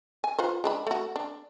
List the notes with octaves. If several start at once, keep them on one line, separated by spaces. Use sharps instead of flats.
G#5
F4 B4 C5
G#3 D4 B5
A3 F#4
D4